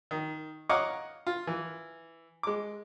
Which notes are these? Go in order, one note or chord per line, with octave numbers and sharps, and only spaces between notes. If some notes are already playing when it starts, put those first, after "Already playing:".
D#3
C#5 D#5 F5 F#5 A#5 D6
F4
E3
G#3 D6